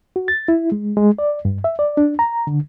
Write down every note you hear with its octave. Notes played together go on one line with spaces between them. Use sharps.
F#4
A6
E4
G#3
G#3
D5
G2
E5
D5
D4
A#5
D3